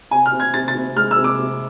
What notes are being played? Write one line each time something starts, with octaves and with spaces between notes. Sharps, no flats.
C3 G#5
F6
C3
G#6
C3 A6
A6
C3
G#3 F6
E6
C3
D6
C3